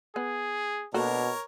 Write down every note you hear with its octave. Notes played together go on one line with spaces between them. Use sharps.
B3 G#4
B2 A#3 D4 F#4 A4 A#4 C#5